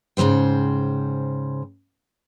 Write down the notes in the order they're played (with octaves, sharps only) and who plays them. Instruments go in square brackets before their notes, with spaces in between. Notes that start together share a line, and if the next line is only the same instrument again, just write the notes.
[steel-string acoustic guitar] G#2 C#3 A3 C5 G5